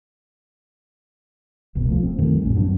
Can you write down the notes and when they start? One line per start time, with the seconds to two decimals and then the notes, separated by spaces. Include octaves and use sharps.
1.75 D#1 C2 B2
1.88 F3 G3 A3
2.03 C4
2.18 F2 D#3 G3 A3
2.43 A#1 A2 C#4
2.55 F#2 B3 D4